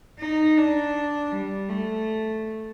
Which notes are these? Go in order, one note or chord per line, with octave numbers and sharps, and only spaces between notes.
D#4
D4
G3
A3